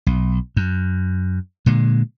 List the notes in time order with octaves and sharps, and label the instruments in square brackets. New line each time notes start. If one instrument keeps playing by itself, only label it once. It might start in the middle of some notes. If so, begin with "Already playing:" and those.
[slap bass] B1
F#2
A#2 D3 G#3